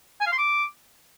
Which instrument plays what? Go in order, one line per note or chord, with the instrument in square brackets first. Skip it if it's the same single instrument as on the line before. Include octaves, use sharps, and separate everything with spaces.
[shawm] G#5
F5
C6
D6